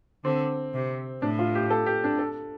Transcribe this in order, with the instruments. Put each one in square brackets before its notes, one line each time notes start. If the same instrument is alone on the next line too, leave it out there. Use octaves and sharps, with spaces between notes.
[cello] D3 [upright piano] C4
[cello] C3
[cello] A2 [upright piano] D4
[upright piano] F4
G4
A4
G4
D4
A4